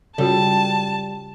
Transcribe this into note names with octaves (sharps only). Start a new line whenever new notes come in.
C#3 G3 F4 F#4 C#5 A5